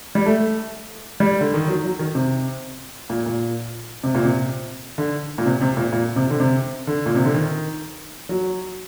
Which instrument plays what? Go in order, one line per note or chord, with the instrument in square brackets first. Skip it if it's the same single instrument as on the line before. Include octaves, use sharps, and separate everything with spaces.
[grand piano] G3
A3
G3
D3
D#3
F#3
F#3
D#3
C3
A#2
A#2
C3
A#2
C3
D3
A#2
C3
C3
A#2
A#2
C3
D3
C3
D3
A#2
C3
D3
D#3
F#3